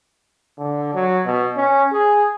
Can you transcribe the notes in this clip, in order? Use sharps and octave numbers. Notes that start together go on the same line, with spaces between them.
D3
F#3
B2
C#4
G#4